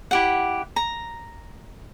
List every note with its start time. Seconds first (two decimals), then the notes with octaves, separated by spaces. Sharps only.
0.11 E4 G4 F#5
0.76 A#5